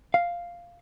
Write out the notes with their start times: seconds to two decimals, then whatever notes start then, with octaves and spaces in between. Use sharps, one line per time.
0.14 F5